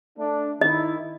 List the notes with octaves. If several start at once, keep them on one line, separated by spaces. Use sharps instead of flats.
A3 D4
D#3 D#4 E4 D#5